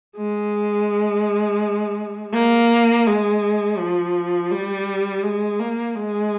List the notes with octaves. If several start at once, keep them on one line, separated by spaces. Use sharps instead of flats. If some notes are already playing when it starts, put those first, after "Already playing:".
G#3
A#3
G#3
F3
G3
G#3
A#3
G#3